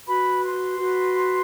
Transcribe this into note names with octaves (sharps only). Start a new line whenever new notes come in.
F#4 B4 B5
C6
F#4 B4